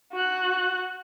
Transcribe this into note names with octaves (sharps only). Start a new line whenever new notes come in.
F#4 F#6